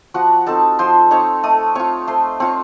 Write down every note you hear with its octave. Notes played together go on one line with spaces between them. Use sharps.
F3 F#4 F#5
C4 D#4 A4 A5
F3 C5 C6
C4 D#4 C#5 C#6
A3 D#5 D#6
C4 F4 C#5 C#6
A3 C5 C6
C4 F4 C#5 C#6